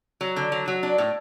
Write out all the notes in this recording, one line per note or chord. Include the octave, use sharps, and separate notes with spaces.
F#3
D3
F#3
F#3
D4
A2